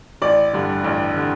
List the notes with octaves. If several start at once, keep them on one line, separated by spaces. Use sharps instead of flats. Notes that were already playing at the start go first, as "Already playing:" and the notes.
A1 D5
G2 D3
A1
D3